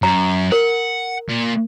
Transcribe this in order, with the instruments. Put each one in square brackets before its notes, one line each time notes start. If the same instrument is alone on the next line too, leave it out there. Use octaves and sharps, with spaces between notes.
[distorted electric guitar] F#2 [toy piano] A#5
[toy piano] A#4 [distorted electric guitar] F#5
[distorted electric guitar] A#2